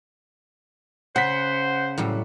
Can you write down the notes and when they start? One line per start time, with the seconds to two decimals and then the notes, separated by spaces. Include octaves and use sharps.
1.16 C#3 C5 F#5 B6
1.98 A2 F#3 G3